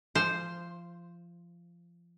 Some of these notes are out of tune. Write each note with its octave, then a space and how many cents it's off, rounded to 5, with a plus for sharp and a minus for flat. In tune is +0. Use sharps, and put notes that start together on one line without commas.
F3 -20 C5 +0